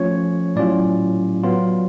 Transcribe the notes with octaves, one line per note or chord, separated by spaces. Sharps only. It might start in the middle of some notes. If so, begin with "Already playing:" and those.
Already playing: F3 A3 C#4 F4 C#5
A2 F#3 C#4 F4 D5
F#3 B3 F4